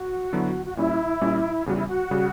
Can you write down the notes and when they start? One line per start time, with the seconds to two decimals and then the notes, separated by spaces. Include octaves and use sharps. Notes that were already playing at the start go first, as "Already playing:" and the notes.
Already playing: F#4
0.33 D3 F#3 B3 E4
0.66 F#4
0.77 A#2 G3 C#4 E4
1.21 A#2 G3 C#4
1.66 E2 C#3 G3 F#4
1.77 E4
1.88 F#4
2.11 C#3 G3